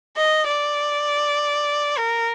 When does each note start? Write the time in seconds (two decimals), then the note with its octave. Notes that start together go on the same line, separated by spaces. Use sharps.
0.16 D#5
0.47 D5
1.97 A#4